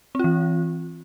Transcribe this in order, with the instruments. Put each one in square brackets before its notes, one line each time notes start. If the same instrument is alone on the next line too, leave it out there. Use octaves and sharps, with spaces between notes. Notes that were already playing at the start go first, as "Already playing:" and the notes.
[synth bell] C4
F4
E3